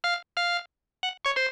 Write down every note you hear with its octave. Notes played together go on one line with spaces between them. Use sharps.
F5 F6
F5 F6
F#5 F#6
C#5 C#6
C5 C6